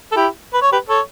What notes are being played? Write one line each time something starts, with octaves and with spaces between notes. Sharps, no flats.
A4
E4 G4
B4
C#5
G4 B4
A4 C#5